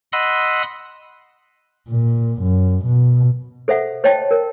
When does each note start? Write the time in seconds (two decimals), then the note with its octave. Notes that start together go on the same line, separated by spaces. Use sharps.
0.13 D#5 F#5 B5 C6 D#6 E6
1.89 A#2
2.42 F#2
2.85 B2
3.68 A4 C5 E5 F#5
4.04 C5 C#5 D#5 G5 A5
4.31 A#4